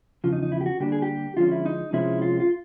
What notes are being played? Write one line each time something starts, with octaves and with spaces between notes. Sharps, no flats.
E2 C#3 F3 F4
D#4
D#4
E4
G4
F#4
D3 G3 A#3 D4 G4
G#4
G4
D3 F3 G#3 C#4 F4
E4
D#4
C3 F3 G#3 C#4 E4
F4
F4